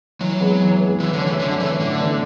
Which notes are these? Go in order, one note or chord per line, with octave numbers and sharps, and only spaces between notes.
E3 F#3
G#3 B3
E3
G#3 B3
E3 F#3
D3
A3 C#4
E3
D3 F#3
E3 A3 C#4
A2 D3
E3 B3 D4